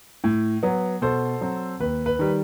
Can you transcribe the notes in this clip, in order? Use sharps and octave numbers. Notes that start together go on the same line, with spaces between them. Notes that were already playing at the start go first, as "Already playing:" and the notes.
A2
F#3 B3
B2 A4 C5
F#3 C4
D#2 B4
B4
D#3 G3